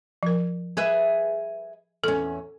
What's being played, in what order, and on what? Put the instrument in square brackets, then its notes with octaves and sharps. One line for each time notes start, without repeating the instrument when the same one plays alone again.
[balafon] F3 A#4
[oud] G#4 B4 E5
[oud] E2 C#4 [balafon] A4